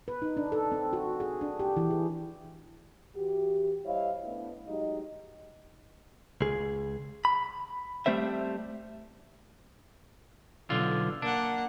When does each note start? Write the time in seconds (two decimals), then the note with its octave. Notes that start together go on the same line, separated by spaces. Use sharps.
0.08 B4
0.22 D#4
0.37 D4
0.52 A4
0.72 C4
0.93 F#4
1.20 G#4
1.41 D4
1.59 G4
1.77 E3
1.91 G#4
3.15 E3 F#4 G4
3.85 G3 E4 C5 C#5 D#5 F5
4.24 A3 B3 D4 E4
4.68 F#3 G#3 D#4 F#4 G4 D#5
6.41 C#2 G#4
7.25 B5
8.06 G3 A3 C4 C5 E5
10.70 B1 D3 F4
11.22 A#3 D4 F#5